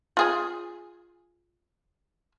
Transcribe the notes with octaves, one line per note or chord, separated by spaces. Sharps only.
F4 G#4 G#5